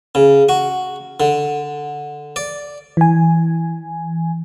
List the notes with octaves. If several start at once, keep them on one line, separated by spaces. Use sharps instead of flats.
C#3
F#4
D3
D5
E3 G#5